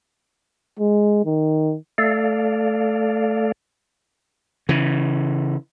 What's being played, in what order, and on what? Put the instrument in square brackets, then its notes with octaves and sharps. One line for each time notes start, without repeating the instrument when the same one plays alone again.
[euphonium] G#3
D#3
[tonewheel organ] A3 A4 D5 F5
[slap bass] C#3 E3